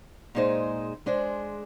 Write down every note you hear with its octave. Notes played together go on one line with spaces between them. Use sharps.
A#2 G#3 D#4 G#4 C5
G#3 D4 G#4 C5